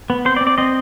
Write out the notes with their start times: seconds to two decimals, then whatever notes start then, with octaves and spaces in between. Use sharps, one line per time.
0.10 B3
0.25 C4 C5
0.36 D5
0.41 C4
0.47 D5
0.58 C4 D#5